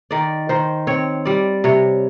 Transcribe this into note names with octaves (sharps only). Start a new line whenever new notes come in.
D#3 D5
D#3 C5
C4 C#5
G3 D5
C3 C#5